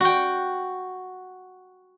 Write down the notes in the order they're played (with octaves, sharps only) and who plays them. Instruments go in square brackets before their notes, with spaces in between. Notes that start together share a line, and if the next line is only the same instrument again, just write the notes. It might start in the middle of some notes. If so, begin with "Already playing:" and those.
[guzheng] F#4 G5